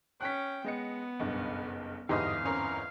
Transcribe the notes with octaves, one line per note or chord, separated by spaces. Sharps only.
C#4 G5 F#6 B6
G#3 B3 D#5 C#7
F#1 B1 G2
G1 E2 G#2 G4 D#5 F5 D#6
C4 C#4 A#4